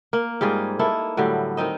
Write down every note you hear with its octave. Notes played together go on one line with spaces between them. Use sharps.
A#3
G#2 G3 F4 G#4
A#3 D#4 E4 A4
A2 D3 F#3 G3
D#3 C4 D#4 D#5